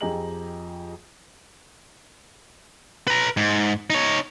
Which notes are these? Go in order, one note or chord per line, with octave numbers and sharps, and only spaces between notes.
F2 G4 G#4 D#5 A#5 F#7
B4 A#5
G#2
D#4 C#5